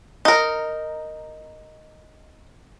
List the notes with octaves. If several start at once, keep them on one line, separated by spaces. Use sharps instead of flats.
D#4 A#4